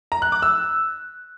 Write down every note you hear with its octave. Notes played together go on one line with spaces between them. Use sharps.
A#5
F#6
D6
E6